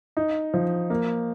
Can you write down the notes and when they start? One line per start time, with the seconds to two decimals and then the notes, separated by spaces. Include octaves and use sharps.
0.17 D#4
0.54 F3
0.90 A#3